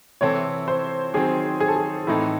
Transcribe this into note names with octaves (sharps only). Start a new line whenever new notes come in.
C3 E3 C4 E4 A4 C#5
C5
D#3 F#3 C4 G#4
G#4
A4
G#4
A2 E3 C4 D#4 E4 A4